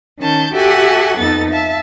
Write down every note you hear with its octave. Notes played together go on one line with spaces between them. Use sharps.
D#3 C#4 A5 G6
F#4 G4 A4 E5 F#5 G#5
F2 B3 D#4 A4 A6
E5 F5 A5